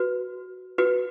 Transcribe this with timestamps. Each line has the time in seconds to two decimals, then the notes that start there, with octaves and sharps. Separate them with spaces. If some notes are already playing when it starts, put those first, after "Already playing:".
Already playing: F#4 B4
0.78 F#4 B4